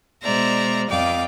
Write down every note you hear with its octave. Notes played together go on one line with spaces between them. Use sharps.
B2 G#3 C5 D5 E5 A#5
F2 D5 D#5 F5 G5 D6